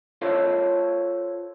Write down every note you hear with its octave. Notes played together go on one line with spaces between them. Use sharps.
F4 A4 C5 C#5 F5